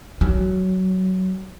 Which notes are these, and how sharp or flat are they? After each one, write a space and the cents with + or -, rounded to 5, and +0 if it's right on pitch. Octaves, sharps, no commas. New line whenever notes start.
F#3 +15